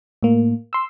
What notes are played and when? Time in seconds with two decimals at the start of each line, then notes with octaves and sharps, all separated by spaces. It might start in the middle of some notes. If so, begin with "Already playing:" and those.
0.23 A2 A#3
0.73 C6 E6